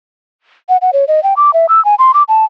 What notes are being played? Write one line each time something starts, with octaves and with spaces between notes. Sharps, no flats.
F#5
F#5
C#5
D#5
G5
D6
E5
E6
G#5
C6
D6
A5